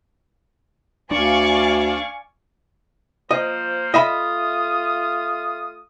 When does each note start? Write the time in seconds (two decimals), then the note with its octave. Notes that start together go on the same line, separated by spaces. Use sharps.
1.11 D2 D4 D5 F5 G#5 C#6
3.31 F3 A#3 C5 D#5
3.94 A3 F4 D#5 E5 B5 D#6